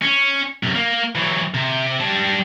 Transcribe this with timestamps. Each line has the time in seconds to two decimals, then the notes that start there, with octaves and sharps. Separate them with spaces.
0.02 C#4
0.63 F#2 C3
0.75 A#3
1.15 E3 F#3
1.54 C3
2.01 G3 A5